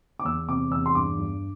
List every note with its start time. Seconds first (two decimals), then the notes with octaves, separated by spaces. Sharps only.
0.19 D6
0.25 E2 E6
0.48 C3 D6
0.71 E2 E6
0.86 C6
0.95 G2 D6
1.18 G2